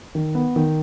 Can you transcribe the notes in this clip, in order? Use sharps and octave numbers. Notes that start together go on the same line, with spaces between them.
D#3
B3
D#3